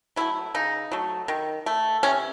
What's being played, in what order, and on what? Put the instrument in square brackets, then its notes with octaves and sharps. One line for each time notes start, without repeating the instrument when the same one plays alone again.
[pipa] F#3 A3 E4
C#3 D#4
F#3 A3
D#3
A3
C3 C#4